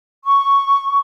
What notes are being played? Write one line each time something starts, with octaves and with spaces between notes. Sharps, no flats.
C#6